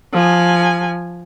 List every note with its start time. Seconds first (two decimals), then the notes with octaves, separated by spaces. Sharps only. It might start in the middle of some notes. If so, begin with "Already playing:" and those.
0.13 F3 G#5